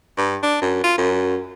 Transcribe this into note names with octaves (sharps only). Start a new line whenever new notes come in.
G2
D4
F#2
F4
F#2